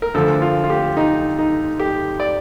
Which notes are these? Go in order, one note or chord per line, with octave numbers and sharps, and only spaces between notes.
A#4
D2 D3 F3 A4
F4
F4
G4
D#4
D#4
G4
D5